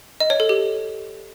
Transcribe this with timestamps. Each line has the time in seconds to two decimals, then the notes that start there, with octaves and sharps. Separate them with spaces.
0.20 D#5
0.30 C#5
0.40 A4
0.49 G4